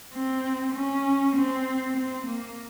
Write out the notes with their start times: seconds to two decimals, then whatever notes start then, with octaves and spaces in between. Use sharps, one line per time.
0.15 C4
0.75 C#4
1.37 C4
1.97 C4
2.27 A#3